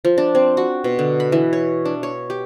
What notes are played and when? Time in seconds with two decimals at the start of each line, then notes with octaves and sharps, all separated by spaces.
0.05 F3
0.18 D4
0.35 C4
0.57 F#4
0.84 B2
0.99 D3
1.20 B5
1.32 E3
1.53 C#5
1.85 D4
2.03 C#5
2.30 G4